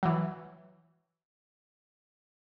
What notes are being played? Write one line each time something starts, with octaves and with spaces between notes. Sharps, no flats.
E3 F#3